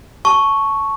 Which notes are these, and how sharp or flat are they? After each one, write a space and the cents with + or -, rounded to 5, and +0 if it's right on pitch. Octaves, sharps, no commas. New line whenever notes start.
A5 +0 C#6 +0